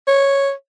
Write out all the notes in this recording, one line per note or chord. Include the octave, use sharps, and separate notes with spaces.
C#5